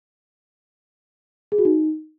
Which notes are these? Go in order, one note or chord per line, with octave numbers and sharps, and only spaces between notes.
G#4
F#4
D#4